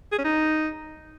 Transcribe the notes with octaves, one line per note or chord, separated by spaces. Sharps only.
G#4
C#4
D#4